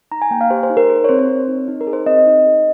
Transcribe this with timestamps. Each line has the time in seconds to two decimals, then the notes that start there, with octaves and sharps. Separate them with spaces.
0.11 D#4 A#5
0.22 G#5
0.31 A#3 G5
0.41 F5
0.50 G4 C5
0.63 C5
0.70 D#4
0.77 A#4
0.89 G#4 C5
1.04 C#5
1.09 C4 C5
1.19 C5
1.29 C4
1.48 D#4
1.68 D#4
1.81 A#4
1.87 G#4
1.93 C5
2.06 C4 D#5
2.26 D#4
2.46 G#4